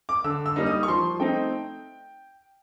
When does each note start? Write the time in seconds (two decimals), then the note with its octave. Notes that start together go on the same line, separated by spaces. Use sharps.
0.09 D6
0.24 D3 E6
0.46 E6
0.56 G3 A#3 D#4
0.66 D#6
0.83 C#6
0.88 F3 C6
1.19 A3 C4 D#4 G5